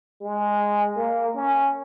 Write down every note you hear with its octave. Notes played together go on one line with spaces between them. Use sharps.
G#3
A#3
C#4